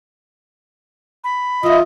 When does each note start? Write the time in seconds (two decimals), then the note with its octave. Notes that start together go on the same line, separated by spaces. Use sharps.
1.24 B5
1.63 E3 F4 D#5 E5